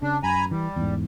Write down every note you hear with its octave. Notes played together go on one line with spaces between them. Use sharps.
C#3 D4
F#2 G#5 A#5 B5
E3 G3
E2 G#2